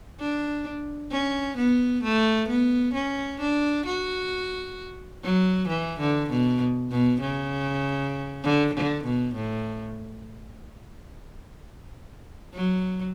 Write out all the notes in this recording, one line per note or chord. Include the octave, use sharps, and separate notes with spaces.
D4
C#4
B3
A3
B3
C#4
D4
F#4
F#3
E3
D3
B2
B2
C#3
D3
D3
B2
A2
F#3